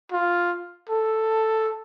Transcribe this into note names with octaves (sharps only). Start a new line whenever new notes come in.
F4
A4